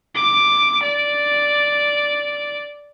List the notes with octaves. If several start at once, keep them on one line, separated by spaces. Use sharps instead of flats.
D6
D5